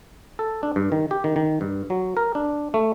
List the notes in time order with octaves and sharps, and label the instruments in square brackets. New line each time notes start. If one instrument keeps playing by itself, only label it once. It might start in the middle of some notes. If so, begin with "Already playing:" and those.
[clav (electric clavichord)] A4
D4
G2
D#3
G4
D#3
D#3
G2
F#3
A#4
D4
A3